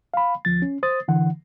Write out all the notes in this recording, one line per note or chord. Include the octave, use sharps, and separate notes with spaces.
F5 B5
D2 F3 A6
C#4
C5 D#6 A6
D3 E3 F#5